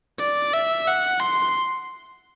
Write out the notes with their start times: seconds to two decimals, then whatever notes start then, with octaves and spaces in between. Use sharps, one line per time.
0.20 D5
0.53 E5
0.87 F#5
1.20 C6